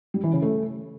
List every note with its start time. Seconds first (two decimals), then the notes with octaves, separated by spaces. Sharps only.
0.14 G3
0.24 E3
0.33 C#3
0.42 A3